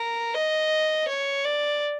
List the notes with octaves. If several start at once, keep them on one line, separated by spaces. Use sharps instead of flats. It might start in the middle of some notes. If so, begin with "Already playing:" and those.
Already playing: A#4
D#5
C#5
D5